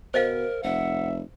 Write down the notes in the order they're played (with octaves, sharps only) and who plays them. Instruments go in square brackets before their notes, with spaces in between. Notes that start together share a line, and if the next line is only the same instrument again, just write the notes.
[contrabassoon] B2 [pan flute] A#4 [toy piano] C5 D#5 F5
[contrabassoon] F1 [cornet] E5 [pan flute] F#5